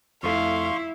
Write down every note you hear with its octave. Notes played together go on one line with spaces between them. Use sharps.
F2 A3 E4 F5 C6 C#6